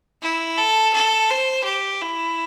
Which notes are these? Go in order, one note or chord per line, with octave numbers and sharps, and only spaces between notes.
E4
A4
A4
C5
G4
E4